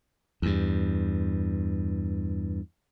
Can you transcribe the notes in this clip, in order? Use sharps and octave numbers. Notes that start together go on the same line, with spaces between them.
E2 G2